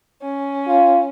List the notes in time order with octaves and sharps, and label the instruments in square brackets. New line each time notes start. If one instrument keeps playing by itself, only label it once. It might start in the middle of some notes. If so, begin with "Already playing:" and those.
[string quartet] C#4
[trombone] F4